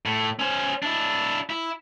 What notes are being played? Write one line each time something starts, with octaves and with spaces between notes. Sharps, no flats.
A2
C#4 C5
D4 E4
E4